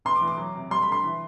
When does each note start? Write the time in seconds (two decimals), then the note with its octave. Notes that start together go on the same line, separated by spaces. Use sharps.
0.05 E2 C6
0.16 D6
0.21 E3
0.28 D6
0.37 F#3
0.55 C3
0.71 G3 C6
0.82 B5
0.88 D3 C6
1.04 E3